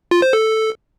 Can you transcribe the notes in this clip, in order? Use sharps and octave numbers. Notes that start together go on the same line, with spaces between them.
F4
C5
A4